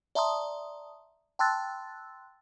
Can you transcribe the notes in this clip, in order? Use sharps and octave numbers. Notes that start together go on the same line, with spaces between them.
D5 E5 A5 A#5 C6 D#6
G5 A5 C6 E6 F#6 A6